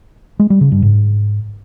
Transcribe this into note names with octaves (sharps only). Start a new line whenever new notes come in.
G#3
G3
C#3
G2
G#2